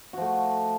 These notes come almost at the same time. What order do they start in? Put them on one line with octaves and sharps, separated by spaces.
F#4 F3 A3